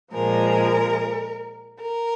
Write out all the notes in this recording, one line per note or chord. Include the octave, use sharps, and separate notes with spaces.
A#2 F3 G#3 A#4
A#4